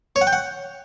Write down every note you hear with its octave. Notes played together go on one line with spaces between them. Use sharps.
C#5
F#5
G5
F#5